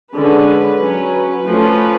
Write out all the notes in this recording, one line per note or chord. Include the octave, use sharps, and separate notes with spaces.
D3 G#3 C#4 B4
F#3 C#4
B4
F3 A3 C#4